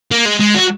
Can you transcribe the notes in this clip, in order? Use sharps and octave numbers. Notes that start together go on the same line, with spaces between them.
A#3
G#3
G#3
F#4